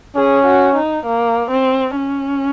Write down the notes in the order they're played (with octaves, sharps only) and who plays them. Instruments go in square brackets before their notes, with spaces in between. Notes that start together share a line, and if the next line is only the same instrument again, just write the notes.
[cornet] C#4 [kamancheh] G#4
[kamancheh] F#4
D#4
A#3
C4
C#4